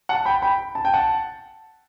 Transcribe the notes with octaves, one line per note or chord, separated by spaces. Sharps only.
F#5 A5
G5 B5
G5 B5
A5
G5
F#5 A5